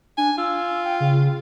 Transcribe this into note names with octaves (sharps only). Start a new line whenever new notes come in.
D4 G#5
F4 E6
G5
C#3